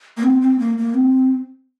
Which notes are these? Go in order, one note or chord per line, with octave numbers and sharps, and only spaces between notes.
A#3
C4
C4
A#3
A#3
C4